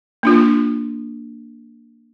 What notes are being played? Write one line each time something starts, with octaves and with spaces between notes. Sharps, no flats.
A#3 D4 F4